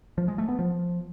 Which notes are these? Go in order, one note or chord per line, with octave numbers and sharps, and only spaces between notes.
F3
G#3
A3
B3
F3